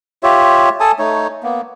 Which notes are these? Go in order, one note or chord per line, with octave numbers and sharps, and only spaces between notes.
F4 G4 C#5 E5
A4 G#5 A5 D#6
A3 D#4 C#5
A#3 B3